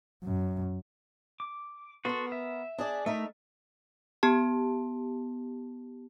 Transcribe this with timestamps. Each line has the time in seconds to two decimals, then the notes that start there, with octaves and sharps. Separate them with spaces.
0.24 F#2
1.40 D6
2.05 B3 F#4 A4 A#4 C6
2.32 E5
2.78 D4 G#4 D5
3.06 A3 D#4 A#4 E5
4.23 B3 G4 A5